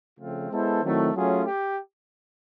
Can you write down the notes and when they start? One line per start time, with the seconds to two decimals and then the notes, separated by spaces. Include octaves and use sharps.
0.19 C#3 F3 A3 C4 F4
0.50 G#3 B3 E4 A4 C5
0.82 D#3 F#3 A3 C4 E4
1.13 F#3 A3 C#4 F4 G#4
1.45 G4